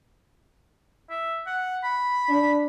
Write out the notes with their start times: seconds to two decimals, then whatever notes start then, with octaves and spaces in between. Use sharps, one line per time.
1.10 E5
1.46 F#5
1.84 B5
2.29 D4